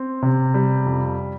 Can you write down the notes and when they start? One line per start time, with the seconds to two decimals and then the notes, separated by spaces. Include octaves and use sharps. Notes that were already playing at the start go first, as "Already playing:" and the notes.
Already playing: C4
0.22 C3
0.54 G3
0.86 F2